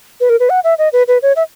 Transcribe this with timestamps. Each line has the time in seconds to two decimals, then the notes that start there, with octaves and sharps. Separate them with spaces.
0.21 B4
0.29 A#4
0.40 B4
0.50 F#5
0.64 E5
0.78 D#5
0.93 B4
1.08 B4
1.22 C#5
1.36 E5